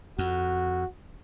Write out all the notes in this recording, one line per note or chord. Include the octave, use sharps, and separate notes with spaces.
F2 F#4